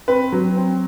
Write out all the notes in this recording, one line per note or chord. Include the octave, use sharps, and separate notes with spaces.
C4 B4
F#3
C4